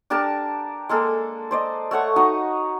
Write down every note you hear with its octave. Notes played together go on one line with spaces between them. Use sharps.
D4 G4 A#4 A5
G#3 A#3 A4
C5 D5 D#5
A3 C#5 F#5 C#6
D#4 F#4 D#5 A#5